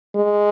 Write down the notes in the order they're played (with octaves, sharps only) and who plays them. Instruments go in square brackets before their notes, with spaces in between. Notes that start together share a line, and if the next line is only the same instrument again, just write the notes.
[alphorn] G#3